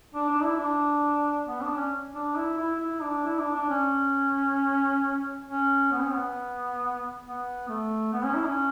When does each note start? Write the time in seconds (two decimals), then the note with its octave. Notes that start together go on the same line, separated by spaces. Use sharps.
0.14 D4
0.29 D4
0.43 E4
0.58 D4
1.47 B3
1.62 D4
1.76 C#4
2.14 D4
2.36 E4
2.58 E4
2.80 E4
3.02 D4
3.25 E4
3.39 D4
3.54 D4
3.69 C#4
5.47 C#4
5.92 B3
6.01 C#4
6.13 B3
7.25 B3
7.69 A3
8.13 B3
8.24 C#4
8.36 E4
8.47 C#4